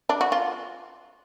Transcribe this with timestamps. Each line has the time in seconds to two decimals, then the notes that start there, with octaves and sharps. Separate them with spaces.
0.09 D4
0.21 F#4
0.32 F4